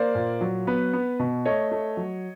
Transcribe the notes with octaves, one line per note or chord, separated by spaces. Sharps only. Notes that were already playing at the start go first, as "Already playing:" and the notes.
Already playing: A#3 C5 D5
A#2
F#3
B3 B4
B3
B2
A3 C#5 D#5
A3
F#3